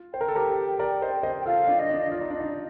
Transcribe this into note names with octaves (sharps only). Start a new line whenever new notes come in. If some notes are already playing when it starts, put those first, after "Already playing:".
Already playing: F4
C5 G5
A#4
A4
G4 A#4
A#4 D5
C5 D#5
C5 D#5
G5
F4 A4 F5
D4 F4
D#5
D4
F4 D5
D#4
D4
D#5
D#4